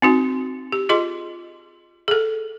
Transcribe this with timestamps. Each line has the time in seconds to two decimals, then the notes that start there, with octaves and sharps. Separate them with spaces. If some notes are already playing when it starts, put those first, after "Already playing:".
0.02 C4 D#4 F#4
0.72 G4
0.89 F4 G#4 D#5 C6
2.08 G#4 A4